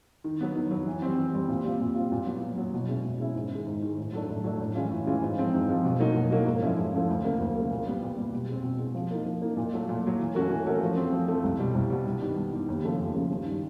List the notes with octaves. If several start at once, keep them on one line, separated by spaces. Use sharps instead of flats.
D#3
F#3 B3
D#3
F#3 B3
E3
G3 C4
E3
G3 C4
A#2
G3 C4 F4
A#2
G3 C4 F4
A#2
F#3 B3
A#2
F#3 B3
B2
G#3 C#4 E4
B2
G#3 C#4 E4
G#2
D#3 G#3
G#2
D#3 G#3
A2
F#3 A3 D4
A2
F#3 A3 D4
A2
E3 G#3 C#4 F4
A2
E3 G#3 C#4 F4
G#2
F3 G#3 C4
G#2
F3 G#3 C4
B2
F#3 A#3 D#4 F#4
B2
F#3 A#3 D#4 F#4
G#2
F3 A3 C#4 E4
G#2
F3 A3 C#4 E4
D2
C#3 F#3 A#3
D2
C#3 F#3 A#3
A#2
G3 B3
A#2
G3 B3
B2
G#3 C4
B2
G#3 C4
F3
A#3 D#4
F3
A#3 D#4
A#2
F#3 A3
A#2
F#3 A3
E3
A3 C#4 F#4 A#4
E3
A3 C#4 F#4 A#4
F3
A3 C4
F3
A3 C4
C2
B2 G3
C2
B2 G3
G2
D#3 G3 B3
G2
D#3 G3 B3
D#2
C#3 F3 A3 C#4
D#2
C#3 F3 A3 C#4
G2
D#3 G3